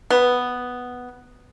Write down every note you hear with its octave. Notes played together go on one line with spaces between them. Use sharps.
B3